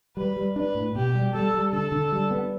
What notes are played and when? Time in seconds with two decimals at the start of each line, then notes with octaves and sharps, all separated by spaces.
0.16 G3 B4
0.36 G3
0.56 D4 B4
0.75 A2
0.95 B2 G4
1.15 G3
1.34 G3 A4
1.54 G3
1.73 D3 A4
1.92 D3
2.12 G3
2.31 B3